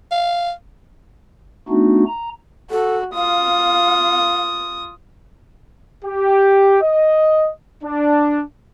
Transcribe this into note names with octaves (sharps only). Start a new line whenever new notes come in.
F5
A3 B3 D4 D#4 F#4
A#5
F#4 A4
F4 F5 D#6
G4
D#5
D4